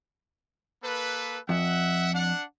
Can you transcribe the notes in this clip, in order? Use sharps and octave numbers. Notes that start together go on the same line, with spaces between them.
A#3 A4 B4
F2 E5 F#5
D4 F#5